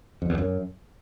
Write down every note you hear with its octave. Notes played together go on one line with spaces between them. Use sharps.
F2
E2
F#2